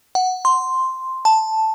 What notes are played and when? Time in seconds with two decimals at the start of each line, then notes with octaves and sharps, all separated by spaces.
0.15 F#5
0.45 C6
1.25 A5